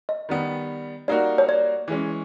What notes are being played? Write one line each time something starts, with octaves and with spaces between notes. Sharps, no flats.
D#5
D#3 G3 B3
G3 A#3 D#4 F#4 D5
C#5
D5
E3 G#3 C#4